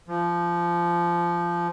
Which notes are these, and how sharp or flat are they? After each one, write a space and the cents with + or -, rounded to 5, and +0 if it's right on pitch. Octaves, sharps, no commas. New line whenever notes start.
F3 -15